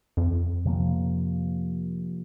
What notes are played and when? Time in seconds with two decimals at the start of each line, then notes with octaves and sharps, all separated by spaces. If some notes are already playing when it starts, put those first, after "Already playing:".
0.17 F2
0.65 C3 F3 A#3